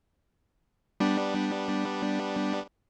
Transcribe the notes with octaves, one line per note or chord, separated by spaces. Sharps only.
G3 B3 D4